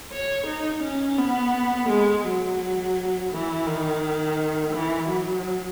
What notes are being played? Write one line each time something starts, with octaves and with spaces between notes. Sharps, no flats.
C#5
D#4
C#4
B3
G#3
F#3
E3
D#3
E3
F#3